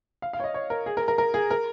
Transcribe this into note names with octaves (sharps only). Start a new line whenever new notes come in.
F5
F5
C#5
D#5
C#5
A#4
G#4
A#4
A#4
A#4
G#4
A#4